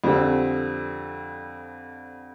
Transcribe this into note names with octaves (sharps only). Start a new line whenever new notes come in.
F2 D3 G3 C4